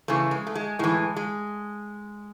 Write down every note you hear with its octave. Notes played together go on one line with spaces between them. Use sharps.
F#2 C#3 E3 A3
G#3
A3
G#3
A2 E3 G#3
G#3